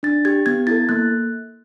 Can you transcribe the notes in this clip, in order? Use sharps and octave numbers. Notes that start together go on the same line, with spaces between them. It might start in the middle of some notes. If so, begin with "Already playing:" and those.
D4 A6
G4 G#6
B3 G#6
E4 A4 A6
A#3 F#6